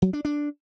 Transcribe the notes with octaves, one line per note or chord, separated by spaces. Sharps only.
F#3
D4
D4